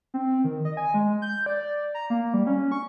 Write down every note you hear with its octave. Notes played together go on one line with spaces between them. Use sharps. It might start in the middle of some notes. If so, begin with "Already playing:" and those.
C4
D#3
D#5
G#5
G#3
G6
D5
A#5
A#3
G3
C#4
C#6